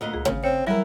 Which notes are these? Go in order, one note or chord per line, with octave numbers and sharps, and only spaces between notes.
D2 A#2 D#5
C#2 G#4
G#1 C#3
C4 C#5
E3 F#3 G3 E4 A#4